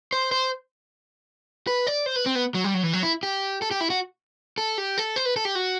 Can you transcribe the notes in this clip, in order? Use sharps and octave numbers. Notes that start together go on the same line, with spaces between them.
C5
C5
B4
D5
C5
B4
C4
B3
F#3
G3
F#3
E3
F#3
E4
G4
A4
G4
E4
F#4
A4
G4
A4
C5
B4
A4
G4
F#4